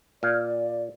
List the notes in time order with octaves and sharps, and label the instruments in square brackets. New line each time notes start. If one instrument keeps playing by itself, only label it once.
[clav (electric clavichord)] A#2 F5 [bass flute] D5